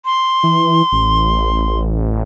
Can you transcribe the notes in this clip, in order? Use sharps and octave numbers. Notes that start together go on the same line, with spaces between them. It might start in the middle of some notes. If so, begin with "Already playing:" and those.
C6
E3
A1